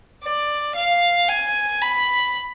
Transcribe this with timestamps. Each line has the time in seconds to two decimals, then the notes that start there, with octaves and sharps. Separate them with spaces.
0.23 D5
0.76 F5
1.28 G#5
1.81 B5